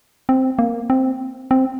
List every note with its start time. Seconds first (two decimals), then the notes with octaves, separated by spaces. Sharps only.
0.29 C4
0.59 A#3
0.90 C4
1.51 C4